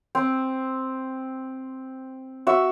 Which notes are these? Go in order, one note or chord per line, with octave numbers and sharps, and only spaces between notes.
C4
F#4 E5